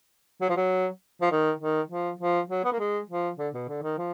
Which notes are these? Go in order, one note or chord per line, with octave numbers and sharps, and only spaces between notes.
F#3
F3
F#3
F3
D#3
D#3
F3
F3
F#3
B3
A#3
G#3
F3
D3
B2
D3
D#3
F3